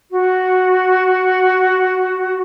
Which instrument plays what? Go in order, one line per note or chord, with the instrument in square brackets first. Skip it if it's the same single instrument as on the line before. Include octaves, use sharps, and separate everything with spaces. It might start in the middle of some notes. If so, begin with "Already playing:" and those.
[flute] F#4